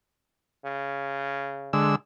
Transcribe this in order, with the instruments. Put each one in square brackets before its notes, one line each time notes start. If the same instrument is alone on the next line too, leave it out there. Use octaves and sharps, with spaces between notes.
[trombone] C#3
[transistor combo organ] D3 G#3 E6